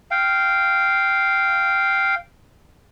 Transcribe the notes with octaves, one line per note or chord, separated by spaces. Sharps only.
F5 G5